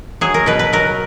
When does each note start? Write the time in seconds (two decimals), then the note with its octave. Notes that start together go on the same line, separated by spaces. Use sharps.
0.21 F#3 G#4
0.34 A#4
0.46 B2 B4
0.59 B4
0.73 F#3 A#4